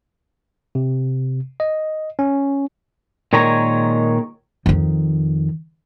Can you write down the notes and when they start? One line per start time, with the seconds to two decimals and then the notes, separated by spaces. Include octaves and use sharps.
0.75 C3
1.60 D#5
2.19 C#4
3.33 A#2 D#3 G#3 C#5 G#5 A#5
4.66 F2 D#3